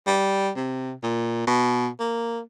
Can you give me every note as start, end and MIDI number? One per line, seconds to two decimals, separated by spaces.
0.07 0.50 55
0.56 0.93 48
1.03 1.47 46
1.47 1.89 47
2.00 2.40 58